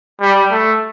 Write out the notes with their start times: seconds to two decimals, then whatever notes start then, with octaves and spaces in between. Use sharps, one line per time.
0.21 G3
0.51 A3